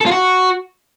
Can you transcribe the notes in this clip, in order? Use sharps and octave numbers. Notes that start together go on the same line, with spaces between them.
A4
F4
F#4